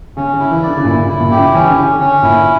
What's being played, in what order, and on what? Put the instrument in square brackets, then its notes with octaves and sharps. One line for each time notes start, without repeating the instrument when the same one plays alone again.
[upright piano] C#3 [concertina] C#4
[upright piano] C#3
[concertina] E4
[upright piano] E3
[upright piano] D3 [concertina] D5
[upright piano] C#3
[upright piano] A#2 [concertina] E4
[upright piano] C#3
[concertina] E4
[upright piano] A#2
[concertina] G4
[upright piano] C#3
[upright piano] E3 [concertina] C#4
[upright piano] D3
[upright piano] C#3 [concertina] C#4
[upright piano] D3
[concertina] C#4
[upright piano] A#2 [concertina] E4